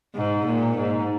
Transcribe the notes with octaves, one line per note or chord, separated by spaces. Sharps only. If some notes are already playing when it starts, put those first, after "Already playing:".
G#2
A#2
G#2